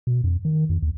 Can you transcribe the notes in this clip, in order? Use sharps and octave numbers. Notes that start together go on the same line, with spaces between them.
B2
F2
D#3
F2
D#2